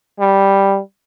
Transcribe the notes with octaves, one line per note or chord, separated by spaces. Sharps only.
G3